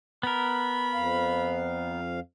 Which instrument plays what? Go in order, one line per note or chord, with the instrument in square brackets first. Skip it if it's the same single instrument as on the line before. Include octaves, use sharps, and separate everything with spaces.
[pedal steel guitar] B3 A#4 [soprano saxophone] B5
[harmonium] F2 F5